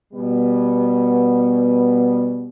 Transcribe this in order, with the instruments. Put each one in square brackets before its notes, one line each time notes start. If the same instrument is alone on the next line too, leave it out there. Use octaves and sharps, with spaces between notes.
[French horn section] B2 G3 B3